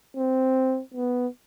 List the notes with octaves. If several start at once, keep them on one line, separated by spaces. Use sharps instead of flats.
C4
B3